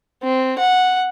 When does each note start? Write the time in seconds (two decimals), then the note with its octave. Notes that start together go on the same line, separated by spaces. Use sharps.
0.23 C4
0.58 F#5